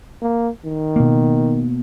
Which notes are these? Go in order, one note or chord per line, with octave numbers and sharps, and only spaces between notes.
A#3
D#3
B2 A#3